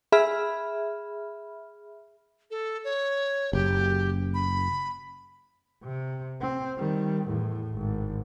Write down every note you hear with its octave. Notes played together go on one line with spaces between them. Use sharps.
G#4 E5 B5 F6
A4
C#5
F#1 G4
B5
C3
C4
D#3 G3
E2 A2
G#1